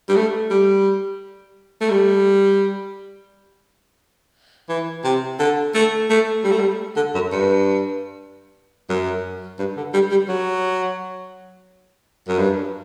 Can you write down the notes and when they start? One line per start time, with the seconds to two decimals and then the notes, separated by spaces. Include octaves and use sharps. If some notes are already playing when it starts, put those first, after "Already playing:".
0.09 G3
0.16 A3
0.50 G3
1.81 A3
1.90 G3
4.69 E3
5.04 C3
5.39 D3
5.74 A3
6.10 A3
6.44 G3
6.51 A3
6.59 G3
6.96 D3
7.14 F#2
7.32 G2
8.89 F#2
9.59 G2
9.77 D3
9.94 G3
10.11 G3
10.28 F#3
12.28 F#2
12.38 G2